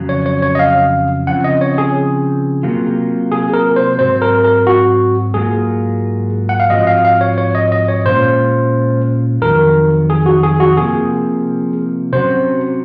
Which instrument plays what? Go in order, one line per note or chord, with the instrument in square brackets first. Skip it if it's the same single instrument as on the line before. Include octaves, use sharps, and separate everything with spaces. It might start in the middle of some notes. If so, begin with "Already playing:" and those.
Already playing: [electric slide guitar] F2 C#3 F#3
[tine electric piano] C#5
C#5
C#5
D#5
F5
[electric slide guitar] C#3 F3 C4 [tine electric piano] F#5
[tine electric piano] D#5
C#5
G#4
[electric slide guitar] C3 F#3 A#3 F4
[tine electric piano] G#4
A#4
C5
[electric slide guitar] G#2 F#3 C4 [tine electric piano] C5
[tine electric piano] A#4
A#4
F#4
[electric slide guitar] G#2 F#3 A#3 F4 [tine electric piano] G#4
[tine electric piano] F#5
F5
[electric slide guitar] G#2 F3 C4 F#4 [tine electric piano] D#5
[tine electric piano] D#5
F5
F5
C#5
C#5
D#5
D#5
C#5
[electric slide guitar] A#2 G#3 C#4 F4 [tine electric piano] C5
[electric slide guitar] F2 D#3 F#3 [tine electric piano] A#4
[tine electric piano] G#4
F#4
G#4
F#4
[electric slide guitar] C3 F3 A#3 [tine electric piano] G#4
[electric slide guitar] C3 F#3 C#4 F#4 [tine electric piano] C5